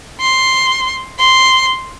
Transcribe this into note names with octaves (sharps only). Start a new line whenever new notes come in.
C6
C6